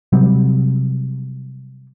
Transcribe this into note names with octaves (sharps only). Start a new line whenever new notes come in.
C3 F#3 G3